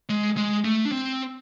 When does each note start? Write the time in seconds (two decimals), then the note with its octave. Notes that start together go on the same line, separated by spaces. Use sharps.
0.09 G#3
0.37 G#3
0.65 A3
0.85 D4
0.92 C4